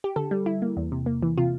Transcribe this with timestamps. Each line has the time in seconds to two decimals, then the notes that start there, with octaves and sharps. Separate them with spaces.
0.04 G4
0.16 D3 A4
0.31 G3
0.46 E4
0.62 A#3
0.77 E2
0.92 C3
1.06 A#3
1.23 E3
1.38 C3 F4